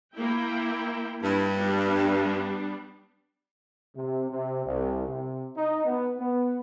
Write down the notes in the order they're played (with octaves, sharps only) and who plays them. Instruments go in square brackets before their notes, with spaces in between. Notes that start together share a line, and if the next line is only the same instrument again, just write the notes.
[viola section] A#3 E4 G5
[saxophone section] G2 [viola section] E4
[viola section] G3 B3 D4
[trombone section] C3
C3
C2
C3
D#4
B3
B3